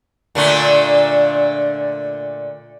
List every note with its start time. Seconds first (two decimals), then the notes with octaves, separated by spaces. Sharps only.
0.35 A#2 D3 A3